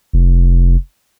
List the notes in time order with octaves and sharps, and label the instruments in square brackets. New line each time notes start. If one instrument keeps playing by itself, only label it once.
[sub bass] F1